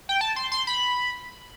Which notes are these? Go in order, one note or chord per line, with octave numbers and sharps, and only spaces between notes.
G5
A5
C6
C6
B5